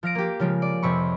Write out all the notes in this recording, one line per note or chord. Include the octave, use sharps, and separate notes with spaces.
F3 F5 A#6 D7
A#3 G4
C#3 F3 G#3
D5
F2 C3 B5 C#6